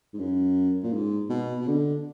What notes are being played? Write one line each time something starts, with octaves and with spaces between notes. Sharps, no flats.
G#2
F#2
A#2
G#2
B2
B2
D3